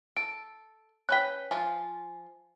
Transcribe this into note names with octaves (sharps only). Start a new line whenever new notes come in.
A4 D7
C#4 B4 G5 F#6 B6
F3 F4 G#5